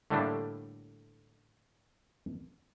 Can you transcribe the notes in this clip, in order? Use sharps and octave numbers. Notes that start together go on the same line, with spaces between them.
A2 D3 G3 A3 A#3 D4